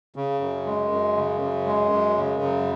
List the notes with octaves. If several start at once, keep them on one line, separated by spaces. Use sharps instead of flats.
C#3
F#2
G#3
F#2
C#3
F#2
G#3
F#2
C#3
F#2